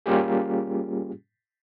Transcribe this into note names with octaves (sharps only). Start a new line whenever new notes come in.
G3 A#3 C#4 F4 G4 G#4